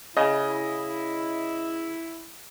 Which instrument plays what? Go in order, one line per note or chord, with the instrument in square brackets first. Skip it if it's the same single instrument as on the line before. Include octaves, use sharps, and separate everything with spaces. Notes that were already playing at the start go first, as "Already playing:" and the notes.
[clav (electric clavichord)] C#3 [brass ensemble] E4 [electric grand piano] D#5